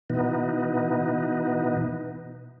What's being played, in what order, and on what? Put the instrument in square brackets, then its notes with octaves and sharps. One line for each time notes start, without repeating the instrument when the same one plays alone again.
[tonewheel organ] B2 E3 B3 D#4